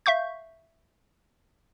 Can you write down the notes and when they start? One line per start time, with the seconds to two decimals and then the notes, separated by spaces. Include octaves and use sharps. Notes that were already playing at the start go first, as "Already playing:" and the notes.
0.06 E5 F5 C#6 G6